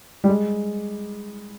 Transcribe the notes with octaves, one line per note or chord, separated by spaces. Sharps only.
G3
G#3